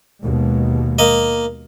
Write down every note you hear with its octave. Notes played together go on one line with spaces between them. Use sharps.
D#2 B2 G#3
A#3 D#5